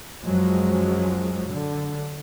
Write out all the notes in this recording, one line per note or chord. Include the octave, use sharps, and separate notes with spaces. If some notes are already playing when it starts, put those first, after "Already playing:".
F#2 F3 F#3 G#3
D3